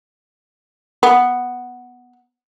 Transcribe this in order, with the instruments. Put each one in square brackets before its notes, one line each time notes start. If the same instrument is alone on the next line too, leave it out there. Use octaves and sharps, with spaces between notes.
[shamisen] B3